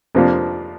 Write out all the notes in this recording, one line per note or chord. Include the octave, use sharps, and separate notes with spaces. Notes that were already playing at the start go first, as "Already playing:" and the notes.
F2 C3 F3 A#3 D4